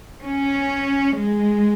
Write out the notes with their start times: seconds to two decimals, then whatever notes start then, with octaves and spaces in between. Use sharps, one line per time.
0.23 C#4
1.16 G#3